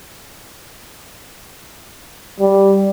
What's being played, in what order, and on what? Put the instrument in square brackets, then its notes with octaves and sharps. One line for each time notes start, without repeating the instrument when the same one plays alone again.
[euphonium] G3